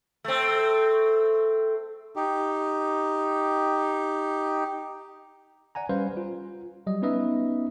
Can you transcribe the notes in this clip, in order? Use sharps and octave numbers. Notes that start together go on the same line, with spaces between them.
A3 C4
D#4 G4
D5 F#5 G#5 A#5
G3 C#4 B4 C5 F5
F4
F#3 G3 D#5
B3 C#4 D#4 B4 D#5 E5